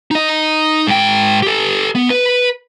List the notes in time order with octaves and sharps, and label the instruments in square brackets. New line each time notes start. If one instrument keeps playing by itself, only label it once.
[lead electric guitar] D#4 D#5
G#2 G5
G4 A4
B3
B4